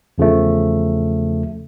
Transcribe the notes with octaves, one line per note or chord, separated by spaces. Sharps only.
E2 C#3 F3 A3